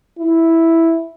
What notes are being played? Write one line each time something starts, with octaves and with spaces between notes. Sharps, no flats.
E4